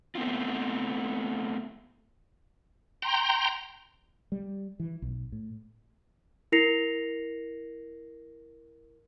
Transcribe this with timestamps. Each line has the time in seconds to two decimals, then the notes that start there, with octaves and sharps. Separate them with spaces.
0.15 A3 B3 C4 E4 F4
3.02 G5 A#5 C6
4.32 G3
4.80 E3
5.02 B1
5.32 A2
6.52 E4 A#4 A#6 C7 C#7 F7